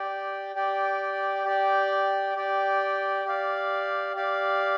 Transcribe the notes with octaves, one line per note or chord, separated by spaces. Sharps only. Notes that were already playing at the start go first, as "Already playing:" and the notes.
Already playing: G4 D5 G5
G4 D5 G5
G4 D5 G5
G4 D5 G5
G4 D5 F5
G4 D5 F5